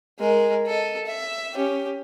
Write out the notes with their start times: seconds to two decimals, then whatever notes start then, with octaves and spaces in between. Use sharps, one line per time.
0.19 G#3 A#4
0.66 A4 D#5
1.06 E5
1.54 C#4 G4